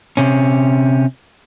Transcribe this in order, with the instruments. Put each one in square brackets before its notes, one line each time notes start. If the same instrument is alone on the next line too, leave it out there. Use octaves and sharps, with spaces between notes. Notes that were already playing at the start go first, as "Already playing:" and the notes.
[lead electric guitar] C3 C#4